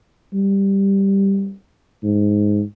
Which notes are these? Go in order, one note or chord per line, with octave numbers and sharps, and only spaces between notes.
G3
G#2